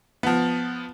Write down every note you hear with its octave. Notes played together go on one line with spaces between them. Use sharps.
F3 B3